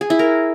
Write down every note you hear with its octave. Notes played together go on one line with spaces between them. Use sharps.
G#4
E4
A#4